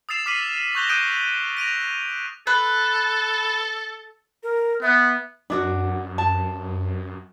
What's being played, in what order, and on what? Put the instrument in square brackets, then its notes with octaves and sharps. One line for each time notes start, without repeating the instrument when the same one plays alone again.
[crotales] D#6 E6 A6 C7 E7 F7
D6 F6 B6 C7 D#7 F#7
C#6 F#6 G6 A#6 F7 G7
D#6 F#6 G6 D7 D#7
A#6 D7 D#7 F7
[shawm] A4 [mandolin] B4
[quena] A#4
[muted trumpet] B3 [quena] E5
[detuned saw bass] F#2 [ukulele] D4 E4 F#4
[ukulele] A5